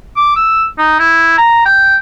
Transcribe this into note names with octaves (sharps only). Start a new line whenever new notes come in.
D6
E6
D#4
E4
A#5
G5